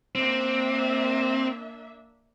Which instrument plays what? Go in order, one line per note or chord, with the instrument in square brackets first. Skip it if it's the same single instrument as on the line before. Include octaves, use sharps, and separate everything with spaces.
[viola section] A#3 D4 E5 [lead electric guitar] C4